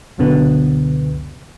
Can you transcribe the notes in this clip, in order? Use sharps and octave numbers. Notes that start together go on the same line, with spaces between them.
C#2 F#2 B2 D3 B3